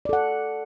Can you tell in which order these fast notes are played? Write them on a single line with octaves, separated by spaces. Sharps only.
D5 A4 F#5